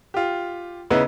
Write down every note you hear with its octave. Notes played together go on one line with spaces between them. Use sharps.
F4 G4
C#3 B3 D#4 E4